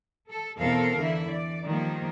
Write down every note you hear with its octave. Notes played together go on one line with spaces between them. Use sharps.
A4
E2 B2 C4 A4 A#4 F5
D3 E3 E4
E3 D5
D#3 F3 G3 A#3